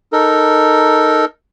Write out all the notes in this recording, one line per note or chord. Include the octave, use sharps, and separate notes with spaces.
D#4 A4 A#4